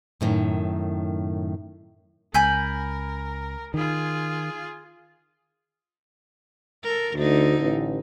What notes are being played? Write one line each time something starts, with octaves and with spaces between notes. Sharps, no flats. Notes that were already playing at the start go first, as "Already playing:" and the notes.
F#2 A2 D#3
C#2 A#4 G#5 B5 G6
D#3 F4 G#4
A4 A#4
D2 D3 D#4
A1